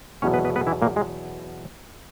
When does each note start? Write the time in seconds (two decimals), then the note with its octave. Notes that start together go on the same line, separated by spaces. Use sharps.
0.22 E2 B2 F#3 C#4 C#5
0.34 B3 B4
0.45 B3 B4
0.56 B3 B4
0.67 E3 E4
0.82 A#2 A#3
0.96 G#3